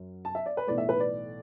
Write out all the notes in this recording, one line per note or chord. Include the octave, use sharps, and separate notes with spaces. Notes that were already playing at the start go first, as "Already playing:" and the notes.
Already playing: F#2
A5
E5
D5
B4
B1 A2 E3 A3 D5
E5
B4
D5